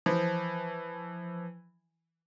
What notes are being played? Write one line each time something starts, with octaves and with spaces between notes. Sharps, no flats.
E3 F3